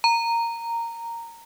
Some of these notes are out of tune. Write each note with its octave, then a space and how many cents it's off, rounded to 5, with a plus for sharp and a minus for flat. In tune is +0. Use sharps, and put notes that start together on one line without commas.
A#5 -10